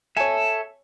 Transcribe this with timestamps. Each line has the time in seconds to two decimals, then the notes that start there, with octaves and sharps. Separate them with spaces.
0.17 A4 C#5 E5 G#5